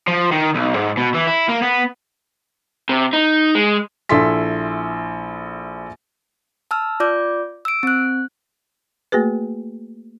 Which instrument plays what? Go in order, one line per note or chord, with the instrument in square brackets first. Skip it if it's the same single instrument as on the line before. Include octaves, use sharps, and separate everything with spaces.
[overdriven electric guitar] F3
D#3
B1
G#2
B2
E3
E4
A#3
B3
C3
D#4
G#3
[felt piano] A#1 E4 A4 C6 B6
[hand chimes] A5 E6 F6
F4 D5 D6 G6
E6 D7
C4 F#6
[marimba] A3 A#3 F#4 G#4 B4